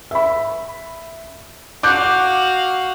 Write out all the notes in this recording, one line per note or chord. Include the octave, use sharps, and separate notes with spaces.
E5 B5
F#4 F5 D6 F#6 G6